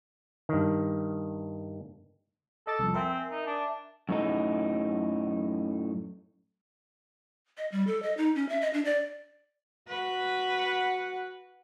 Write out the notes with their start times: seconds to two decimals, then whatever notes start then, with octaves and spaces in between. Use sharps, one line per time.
0.49 G2 D#3
2.67 A4 D#5 D6 A6
2.79 C2 F2
2.94 C4 A#4 E5 G#5
3.31 D#4
3.46 D4
4.09 F#2 A2 D#4
7.57 D#5
7.72 G3
7.87 A4
8.03 D#5
8.17 D#4
8.35 C#4
8.49 E5
8.61 D#5
8.73 D4
8.85 D5
9.88 F#4 B4
10.59 F#5